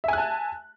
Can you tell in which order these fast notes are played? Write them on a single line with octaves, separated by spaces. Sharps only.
E5 G#5 F#6 A5